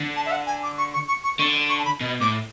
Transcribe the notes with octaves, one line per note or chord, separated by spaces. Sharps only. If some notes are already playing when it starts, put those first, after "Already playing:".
Already playing: D3
A5
E5
F#5
G#5
D6
C#6
C#6
C#6
C#6
D3 C#6
C#6
A5
B5
B2
A2 D6